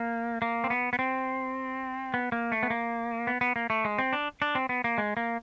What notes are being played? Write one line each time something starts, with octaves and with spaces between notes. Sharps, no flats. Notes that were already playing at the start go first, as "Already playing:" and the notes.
Already playing: A#3
A#3
C4
B3
B3
C4
B3
A#3
A3
B3
A#3
B3
B3
A#3
A3
G#3
C4
D4
D4
C4
B3
A#3
G#3
A#3